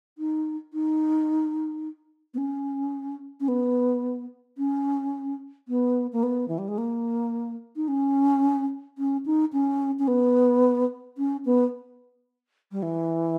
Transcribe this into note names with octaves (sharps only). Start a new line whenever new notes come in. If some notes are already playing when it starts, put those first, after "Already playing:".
D#4
D#4
B3
C#4
C#4
B3
C#4
B3
A#3
B3
E3
G3
G#3
A#3
D#4
C#4
C#4
D#4
C#4
C#4
B3
C#4
B3
G3
E3